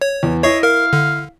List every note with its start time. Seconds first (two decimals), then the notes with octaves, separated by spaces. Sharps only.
0.01 C#5
0.23 E2
0.44 E4 C#5 D#5 C#6 C7
0.63 A#4 F5
0.93 D3